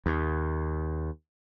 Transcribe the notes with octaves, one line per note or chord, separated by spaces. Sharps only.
D#2